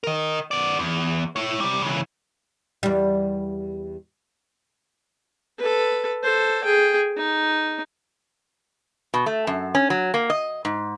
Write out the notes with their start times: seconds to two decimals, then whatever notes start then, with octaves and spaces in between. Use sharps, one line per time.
0.04 A#4 D#5
0.51 B3 D5
0.79 E2
1.36 E4 C#5
1.60 C3 G3
1.82 C#3 E3
2.83 E2 G3
5.59 A4 B4
6.23 A4 C5
6.64 G#4 G5
7.17 D#4
9.14 B2
9.26 A3
9.47 F#2
9.75 C#4
9.90 F#3
10.14 A#3
10.30 D#5
10.65 G#2